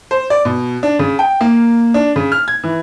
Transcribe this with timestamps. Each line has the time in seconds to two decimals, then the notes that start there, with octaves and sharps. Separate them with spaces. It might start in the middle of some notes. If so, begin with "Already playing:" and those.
0.11 C5
0.30 D5
0.45 B2
0.83 D4
0.99 C#3
1.19 G5
1.41 A#3
1.94 D4
2.16 C#3
2.32 F6
2.48 G#6
2.64 E3